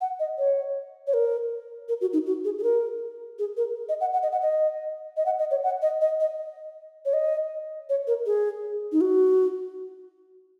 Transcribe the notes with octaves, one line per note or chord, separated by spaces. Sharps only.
F#5
D#5
C#5
C#5
A#4
A#4
F#4
D#4
F#4
G#4
G#4
A#4
G#4
A#4
D#5
F#5
F#5
D#5
F#5
D#5
D#5
F#5
D#5
C#5
F#5
D#5
D#5
D#5
C#5
D#5
C#5
A#4
G#4
D#4
F#4